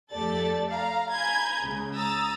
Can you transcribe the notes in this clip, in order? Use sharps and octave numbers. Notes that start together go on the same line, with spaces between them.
F2 A3 G4 A4 D5 A6
F5 A#5
G#5 A#5 B5 G6 G#6
C#2 C#3
A#5 D#6 E6 A6